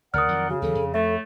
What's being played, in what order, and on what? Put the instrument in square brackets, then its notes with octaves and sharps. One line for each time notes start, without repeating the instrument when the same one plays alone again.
[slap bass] D2 C#3 [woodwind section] A#4 D5 F#5 [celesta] D#6 F6
[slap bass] F2 D#3 F#3
[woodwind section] C#3 [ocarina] F#4
[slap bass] D#2 E3 F#3 [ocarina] A4
[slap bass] F2
[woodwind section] A2 A3 [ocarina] A4 [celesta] E5